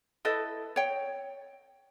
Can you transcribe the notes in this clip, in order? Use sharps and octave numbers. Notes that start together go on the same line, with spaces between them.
E4 A4 B4 D#5
C#5 G5